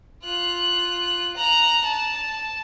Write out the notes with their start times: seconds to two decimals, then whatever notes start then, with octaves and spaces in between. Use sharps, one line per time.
0.23 F4 F#6
1.36 A#5 F#6
1.84 A5